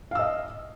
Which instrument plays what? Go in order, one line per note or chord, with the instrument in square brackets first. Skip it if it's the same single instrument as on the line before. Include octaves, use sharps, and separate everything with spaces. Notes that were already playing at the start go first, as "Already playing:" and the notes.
[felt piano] F5
E6
D#5